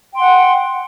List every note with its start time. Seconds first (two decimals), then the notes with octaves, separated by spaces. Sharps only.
0.12 G5
0.16 C6
0.19 F#5